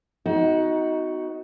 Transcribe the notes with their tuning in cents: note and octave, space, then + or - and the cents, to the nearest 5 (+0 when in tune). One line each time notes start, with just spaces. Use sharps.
B3 +45 D#4 +20 F#4 +0